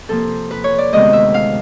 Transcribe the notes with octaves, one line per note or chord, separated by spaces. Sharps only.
C3 F3 A#3 A4
B4
C#5
D5
D2 C3 D#3 G#3 B3 D#5
E5
F5